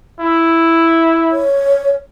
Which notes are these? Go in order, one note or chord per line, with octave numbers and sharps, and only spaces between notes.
E4
C#5